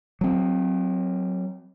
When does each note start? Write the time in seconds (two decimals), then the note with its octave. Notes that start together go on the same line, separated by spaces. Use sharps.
0.21 F#3 C4